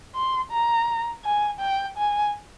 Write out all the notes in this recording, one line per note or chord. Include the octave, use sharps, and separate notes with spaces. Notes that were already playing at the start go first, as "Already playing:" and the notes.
C6
A#5
G#5
G5
G#5